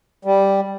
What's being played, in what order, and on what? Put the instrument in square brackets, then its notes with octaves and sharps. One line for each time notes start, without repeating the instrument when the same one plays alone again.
[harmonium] G3